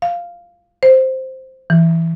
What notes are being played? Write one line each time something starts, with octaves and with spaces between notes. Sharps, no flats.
F5
C5
E3